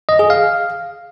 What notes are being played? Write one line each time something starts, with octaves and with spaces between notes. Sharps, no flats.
D#5
G#4
F5